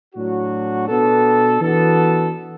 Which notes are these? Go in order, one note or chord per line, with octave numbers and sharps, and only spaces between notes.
A2 F#3 D4 F#4
B2 B3 D4 A4
E3 B3 D4 F#4 A4